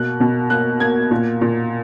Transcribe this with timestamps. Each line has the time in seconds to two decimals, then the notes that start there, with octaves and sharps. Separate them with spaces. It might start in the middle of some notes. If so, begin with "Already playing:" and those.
Already playing: B2 A#3 F#6
0.20 B2
0.50 A#3 F#6
0.80 A#3 G#6
1.11 A#2
1.41 A#2